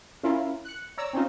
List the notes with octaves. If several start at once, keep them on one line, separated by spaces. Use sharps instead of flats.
C#4 E4 F4 A#4
F#6 C#7
C#5 D5 A#5 E6
C4 C#4 D#4 F4